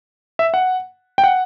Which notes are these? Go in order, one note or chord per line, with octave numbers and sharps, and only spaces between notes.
E5
F#5
G5
F#5